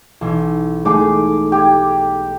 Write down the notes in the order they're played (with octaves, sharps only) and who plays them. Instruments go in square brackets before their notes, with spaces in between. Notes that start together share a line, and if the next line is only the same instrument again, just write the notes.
[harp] B1 E3
[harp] G#3 A3 D#4 [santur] G#4 D6
[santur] G4 [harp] G6 G#6